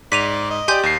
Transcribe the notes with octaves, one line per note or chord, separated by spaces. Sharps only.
G#2 D5 B6 D#7 F7
D#5
G4 D5 G#5 C6 G6
D#2 C7